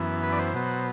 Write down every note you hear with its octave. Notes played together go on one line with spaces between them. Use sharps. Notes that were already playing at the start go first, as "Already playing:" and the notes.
Already playing: F#2 E3 B3
B4
D5
C5
B2 F#3 B3